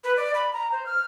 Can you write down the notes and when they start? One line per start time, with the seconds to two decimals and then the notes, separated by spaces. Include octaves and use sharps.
0.04 B4
0.17 D5
0.35 B5
0.53 A#5
0.72 C5
0.86 F6